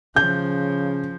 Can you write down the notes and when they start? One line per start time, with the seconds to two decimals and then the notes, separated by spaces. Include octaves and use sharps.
0.16 C#3 F3 G6